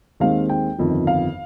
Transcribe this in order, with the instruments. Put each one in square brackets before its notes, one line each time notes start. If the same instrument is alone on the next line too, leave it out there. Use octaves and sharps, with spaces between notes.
[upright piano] D#2 D#3 G#3 C4 F5
G5
G1 F2 D#3
F5